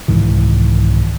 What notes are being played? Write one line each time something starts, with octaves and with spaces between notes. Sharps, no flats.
C2 G#2 D#3 E3